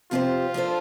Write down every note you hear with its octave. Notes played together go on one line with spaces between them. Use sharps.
C3 F3 C4 F4 G4 C5
F3 D4 A4 C5